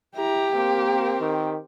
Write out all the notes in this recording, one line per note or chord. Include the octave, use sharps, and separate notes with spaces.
E4 G4 A#5
A#3 C4 A#4
D#3